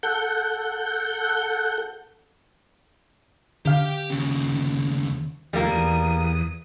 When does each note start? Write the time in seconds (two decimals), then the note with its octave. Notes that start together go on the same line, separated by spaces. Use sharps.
0.03 A4 F#5 G6
3.66 D3 G4 F5 G5
4.10 D#2 C#3
5.53 D#2 F3 G3 A3 A#3
5.71 E2 D#6